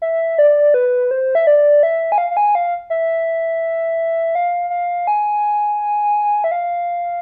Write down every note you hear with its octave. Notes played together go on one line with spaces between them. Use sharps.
E5
D5
B4
C5
E5
D5
E5
G#5
F5
F5
G#5
F5
E5
F5
F5
G#5
E5
F5